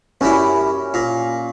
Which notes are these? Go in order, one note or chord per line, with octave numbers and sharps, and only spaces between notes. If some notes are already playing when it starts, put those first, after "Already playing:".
F#2 G3 C#4 E4
A#2